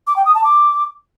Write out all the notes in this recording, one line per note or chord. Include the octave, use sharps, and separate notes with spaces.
D6
G5
D#6
A5
D6